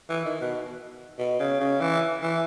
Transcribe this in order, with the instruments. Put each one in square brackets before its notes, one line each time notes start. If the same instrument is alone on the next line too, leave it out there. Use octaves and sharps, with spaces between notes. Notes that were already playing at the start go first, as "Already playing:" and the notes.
[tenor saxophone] E3
D#3
B2
B2
C#3
C#3
E3
E3